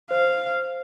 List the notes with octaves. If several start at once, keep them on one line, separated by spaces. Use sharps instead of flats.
C5 F5